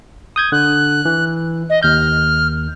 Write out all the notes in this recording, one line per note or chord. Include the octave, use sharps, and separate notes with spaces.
D#6 G6 G#6
D3 F#6
E3
D#5
D#2 F6 G6